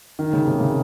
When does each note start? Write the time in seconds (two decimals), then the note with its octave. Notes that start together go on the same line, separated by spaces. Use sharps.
0.19 D#3
0.33 C#3
0.47 C3
0.60 C#3